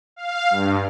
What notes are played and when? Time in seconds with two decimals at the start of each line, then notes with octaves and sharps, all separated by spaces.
0.16 F5
0.50 G2